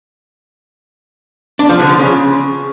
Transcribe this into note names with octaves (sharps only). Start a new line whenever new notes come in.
D4
F3
D3
F3
C#3